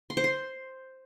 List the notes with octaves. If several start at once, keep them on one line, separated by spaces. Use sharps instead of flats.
C6
C5
C6